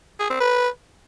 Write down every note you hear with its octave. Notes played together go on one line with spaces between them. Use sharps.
G#4
C4
B4